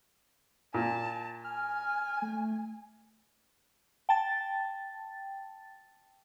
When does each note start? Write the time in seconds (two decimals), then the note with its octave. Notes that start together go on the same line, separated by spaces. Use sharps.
0.74 A#2 A5
1.44 G#5 F6
2.22 A3
4.09 G5 A5 A6